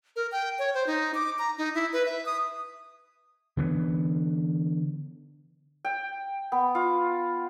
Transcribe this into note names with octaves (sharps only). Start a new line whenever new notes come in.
A#4
G5
C#5
C5
D#4
D6
A#5
D#4
E4
B4
E5
D#6
D3 E3 B3
G5
B3
F4